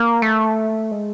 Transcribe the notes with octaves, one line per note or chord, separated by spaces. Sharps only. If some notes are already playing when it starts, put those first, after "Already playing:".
Already playing: A#3
A3
G#3